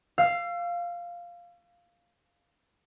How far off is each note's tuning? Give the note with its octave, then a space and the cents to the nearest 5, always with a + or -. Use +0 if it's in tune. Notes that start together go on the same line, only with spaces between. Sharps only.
F5 +0 E6 +40